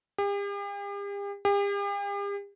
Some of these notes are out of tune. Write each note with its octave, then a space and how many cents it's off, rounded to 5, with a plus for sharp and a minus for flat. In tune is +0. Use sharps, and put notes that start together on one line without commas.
G4 +45
G4 +45